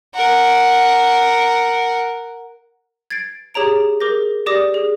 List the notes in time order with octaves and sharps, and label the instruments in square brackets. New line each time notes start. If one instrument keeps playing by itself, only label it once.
[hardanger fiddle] A#4 F#5
[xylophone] G#6 A6 C7 D7
G4 G#4 C#5 A#5 D7
G#4 A#4 D6 G6 A#6
G4 D5 D6 D#6 A#6
G#4